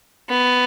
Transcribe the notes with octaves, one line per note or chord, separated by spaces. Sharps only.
B3